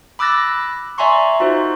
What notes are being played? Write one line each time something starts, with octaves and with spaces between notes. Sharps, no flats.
B5 D6 E6 F#6 A6 A#6
D5 E5 G#5 A#5 C6 C#6
D#4 F4 F#4 C5